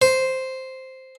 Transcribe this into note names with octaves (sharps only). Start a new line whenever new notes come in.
C5